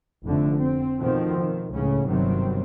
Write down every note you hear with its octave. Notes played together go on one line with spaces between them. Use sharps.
F1 F2 D3 A3
C4
B2 D#3 F3 A3 C4
D#3
C#2 A2 C#3 C#4
G1 C3 D#3 F#3 G3 C4